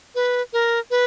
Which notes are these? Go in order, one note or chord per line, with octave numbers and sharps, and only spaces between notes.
B4
A#4
B4